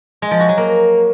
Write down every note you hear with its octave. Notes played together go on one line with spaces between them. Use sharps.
G#3
F3
F#4
F#3
A#3